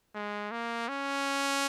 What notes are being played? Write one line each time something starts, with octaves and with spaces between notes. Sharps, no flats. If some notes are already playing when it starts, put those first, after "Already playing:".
G#3
A#3
C#4